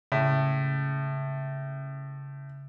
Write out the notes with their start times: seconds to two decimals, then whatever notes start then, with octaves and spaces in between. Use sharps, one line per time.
0.12 A2 C#3